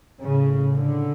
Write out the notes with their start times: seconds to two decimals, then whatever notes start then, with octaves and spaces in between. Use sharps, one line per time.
0.23 A2 C#3
0.75 D3